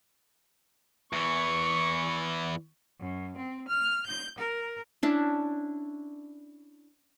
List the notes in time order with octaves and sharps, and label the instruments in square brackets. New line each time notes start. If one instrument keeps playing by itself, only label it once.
[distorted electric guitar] E2 E3 [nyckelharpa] C#6
[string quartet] F#2
C4
F6
G6
A#4
[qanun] C#4 D4 E4